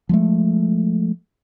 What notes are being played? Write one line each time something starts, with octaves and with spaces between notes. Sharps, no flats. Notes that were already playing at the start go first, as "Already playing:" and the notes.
F3 G#3 A3